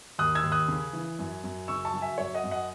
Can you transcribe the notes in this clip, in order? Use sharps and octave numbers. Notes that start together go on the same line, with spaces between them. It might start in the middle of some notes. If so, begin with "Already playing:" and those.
D#2 D#6 F#6
E6 G#6
D#2
D#6 F#6
C#3
E3
F#2
F#2
C#3 C#6 E6
A5 C#6
F#3
E5 G#5
F#2 C#5 E5
D#5 F#5
F#2
D#5 F#5